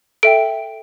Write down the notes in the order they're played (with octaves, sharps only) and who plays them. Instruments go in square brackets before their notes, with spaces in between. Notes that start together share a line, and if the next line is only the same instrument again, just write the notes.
[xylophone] A4 E5 G5 D7